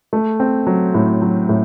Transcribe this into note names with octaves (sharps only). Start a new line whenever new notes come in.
A3
C4
F#3
A2
F#3
A2